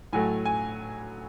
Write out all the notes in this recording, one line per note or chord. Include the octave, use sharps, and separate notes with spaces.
A2 F#3 A3 G#5
G#5